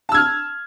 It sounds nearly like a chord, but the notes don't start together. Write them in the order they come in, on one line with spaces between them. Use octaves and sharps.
A5 E6 G#6 F6